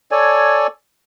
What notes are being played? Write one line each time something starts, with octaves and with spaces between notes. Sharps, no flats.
A4 C#5 D5 G#5